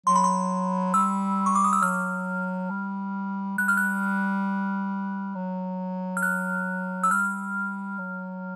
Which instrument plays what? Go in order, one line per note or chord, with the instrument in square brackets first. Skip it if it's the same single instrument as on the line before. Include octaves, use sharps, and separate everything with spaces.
[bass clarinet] F#3 [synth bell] C6
[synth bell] B5
C6
[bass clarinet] G3 [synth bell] E6
[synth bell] C#6
D6
D#6
E6
[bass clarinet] F#3 [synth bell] F6
[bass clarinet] G3
[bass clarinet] G3 [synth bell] F#6
[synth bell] F6
F#6
[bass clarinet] F#3
[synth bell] F6
F#6
E6
[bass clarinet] G3 [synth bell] F6
[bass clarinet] F#3